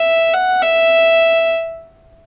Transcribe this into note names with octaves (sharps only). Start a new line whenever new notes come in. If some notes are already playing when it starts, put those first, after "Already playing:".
Already playing: E5
F#5
E5